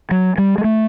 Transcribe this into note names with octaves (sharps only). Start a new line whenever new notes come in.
F#3
G3
G#3
A3